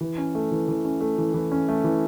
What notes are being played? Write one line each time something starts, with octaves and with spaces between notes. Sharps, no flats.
E3
C#4
A3
E3
E3
C#4
A3
E3
E3
C#4
A3
E3